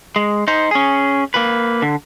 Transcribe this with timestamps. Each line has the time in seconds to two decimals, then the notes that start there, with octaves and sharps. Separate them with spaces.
0.16 G#3
0.48 D#4 C5
0.71 C#4 G#4
1.34 A#3 B4
1.82 D3